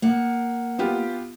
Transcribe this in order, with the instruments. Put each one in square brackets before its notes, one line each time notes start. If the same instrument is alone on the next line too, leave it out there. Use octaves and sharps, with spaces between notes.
[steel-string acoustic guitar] A#3 F#5
[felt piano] B3 F4 G4